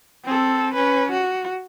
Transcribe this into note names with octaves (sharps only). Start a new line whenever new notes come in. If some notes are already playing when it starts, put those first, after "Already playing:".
C4 A4
C#4 B4
F#4